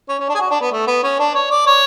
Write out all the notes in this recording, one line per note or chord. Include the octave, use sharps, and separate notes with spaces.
C#4
C#4
D4
G#4
F#4
D4
B3
A3
B3
C#4
D4
C#5
D5
C#5